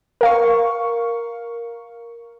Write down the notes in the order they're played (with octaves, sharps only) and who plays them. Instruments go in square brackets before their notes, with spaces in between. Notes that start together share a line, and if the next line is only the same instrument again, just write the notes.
[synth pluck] A#4 F5 C#6